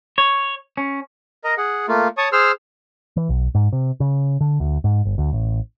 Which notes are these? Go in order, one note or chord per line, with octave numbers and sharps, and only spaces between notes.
C#5
C#4
A#4 D#5 A#5
G#4 F#5
A3 A#3 F4
C#5 A5 C#6 D#6
G#4 C5 C6 E6 F6
E3
B1
G#2
C3
C#3
D3
D2
G#2
G1
D2
A1